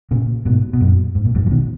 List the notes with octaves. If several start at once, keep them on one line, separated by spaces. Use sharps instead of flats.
A#2 C#3
G#2 B2
B2
F#2 A#2
G#2
A#2
F2 G#2
F3
B2 D#3